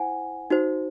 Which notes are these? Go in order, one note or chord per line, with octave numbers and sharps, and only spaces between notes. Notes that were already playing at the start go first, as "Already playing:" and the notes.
Already playing: E4 C5 F#5 G#5
D#4 F#4 C5